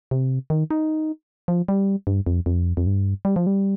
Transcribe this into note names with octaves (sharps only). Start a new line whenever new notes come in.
C3
D#3
D#4
F3
G3
G2
F2
F2
F2
G2
G3
F3
G3